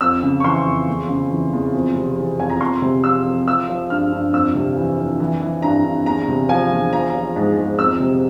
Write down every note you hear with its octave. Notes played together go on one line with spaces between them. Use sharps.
F2 E6
C#3
C#6
E3 C6
F2
E2
C#3
E3
E2
F2
C3
E3
F2 G#5
A#5
F2 C6
C3
F3 E6
F2
F3 E6
F3
G2 F6
G2
F2 E6
C3
E3
F2
E3
E3
G2 A#5
G2
E2 A#5
C3
F3 G#5
E2
F3 A#5
F3
G#2
G#2
F2 E6
C3